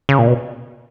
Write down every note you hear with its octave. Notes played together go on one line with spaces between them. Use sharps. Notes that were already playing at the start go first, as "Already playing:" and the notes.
C#3
A#2
B2